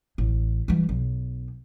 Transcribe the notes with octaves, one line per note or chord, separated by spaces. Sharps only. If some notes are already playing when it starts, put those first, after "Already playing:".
A1
E3 G3
B1